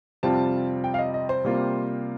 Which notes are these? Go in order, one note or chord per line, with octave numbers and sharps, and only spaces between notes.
F2 C3 G3 C4 F4 A5
G5
F5
D#5
D#5
C5
C3 G3 A#3 F4